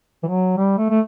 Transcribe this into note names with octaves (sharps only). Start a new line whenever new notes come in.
E3
F#3
G3
A3
A3